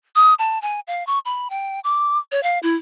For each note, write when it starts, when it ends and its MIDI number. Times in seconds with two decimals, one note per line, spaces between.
0.16 0.34 87
0.39 0.61 81
0.62 0.80 80
0.87 1.06 77
1.07 1.19 85
1.25 1.48 83
1.50 1.80 79
1.84 2.18 86
2.32 2.42 73
2.43 2.59 77
2.63 2.76 64